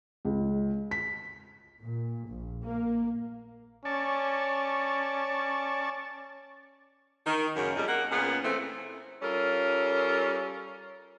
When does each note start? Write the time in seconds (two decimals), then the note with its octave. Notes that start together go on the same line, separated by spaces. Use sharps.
0.25 C#2
0.91 B6
1.82 A#2
2.27 A#1
2.65 A#3
3.85 C#4 D5 A5 C#6
7.25 D#3
7.54 F#2 C#3 A#3
7.76 F2 G3 D#4
7.88 A#3 F#5
8.11 A#2 B3 C#4 G#4
8.43 E3 A3 C4
9.22 G3 C#4 F4 A4 A#4